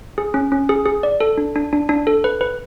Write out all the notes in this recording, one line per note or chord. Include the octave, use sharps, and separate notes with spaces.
G#4
C#4
C#4
G#4
G#4
D5
A4
D4
D4
D4
D4
A4
B4
B4